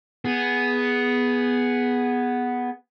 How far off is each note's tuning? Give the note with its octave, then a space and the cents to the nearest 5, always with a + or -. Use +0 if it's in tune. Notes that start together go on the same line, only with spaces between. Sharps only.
B3 +0 G#4 +0